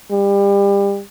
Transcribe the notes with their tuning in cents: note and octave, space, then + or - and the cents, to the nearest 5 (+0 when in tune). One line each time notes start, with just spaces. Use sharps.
G3 +30